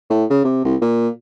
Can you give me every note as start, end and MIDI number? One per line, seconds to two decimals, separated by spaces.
0.10 0.24 45
0.30 0.43 49
0.44 0.63 48
0.65 0.76 36
0.81 1.08 46